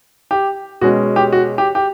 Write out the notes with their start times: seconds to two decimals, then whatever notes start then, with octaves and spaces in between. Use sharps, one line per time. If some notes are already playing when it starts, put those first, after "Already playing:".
0.31 G4
0.81 B2 G#3 C#4 F#4
1.16 G4
1.32 F#4
1.58 G4
1.75 G4